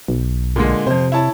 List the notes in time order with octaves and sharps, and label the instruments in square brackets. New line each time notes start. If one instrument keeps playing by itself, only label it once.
[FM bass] B1
[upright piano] A#2 D3 G#3
[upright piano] F2 C5 [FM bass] C3
[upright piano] E4 C#5 A5